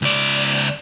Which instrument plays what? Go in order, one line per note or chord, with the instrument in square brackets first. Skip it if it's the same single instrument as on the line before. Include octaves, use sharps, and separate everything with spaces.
[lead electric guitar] C#2 D5